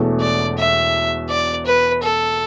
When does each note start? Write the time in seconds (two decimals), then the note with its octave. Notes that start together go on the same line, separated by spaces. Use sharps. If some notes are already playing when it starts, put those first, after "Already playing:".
Already playing: E1 E2 B2 A3
0.21 D5
0.57 E5
1.29 D5
1.66 B4
2.02 A4